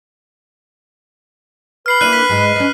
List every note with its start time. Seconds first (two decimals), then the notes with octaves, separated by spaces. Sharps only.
1.86 B4 F6 C7 F#7
2.01 A#3 D4 E4 F#6 D#7 F#7
2.13 B6
2.30 G#2 G#3
2.56 C#4 D#4